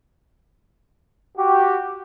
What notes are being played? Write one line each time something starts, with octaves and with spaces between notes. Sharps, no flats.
F#4 G4